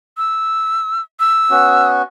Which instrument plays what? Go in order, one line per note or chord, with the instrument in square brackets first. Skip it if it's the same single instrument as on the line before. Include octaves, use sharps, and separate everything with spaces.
[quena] E6
E6
[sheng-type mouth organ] B3 C#4 F#4